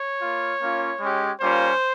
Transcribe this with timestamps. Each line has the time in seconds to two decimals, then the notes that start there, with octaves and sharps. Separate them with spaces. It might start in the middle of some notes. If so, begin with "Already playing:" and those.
Already playing: C#5
0.20 A#3 F4
0.60 A#3 C#4 F4
0.99 G#3 C#4 G4
1.39 G3 A#3 C#4 F4 C5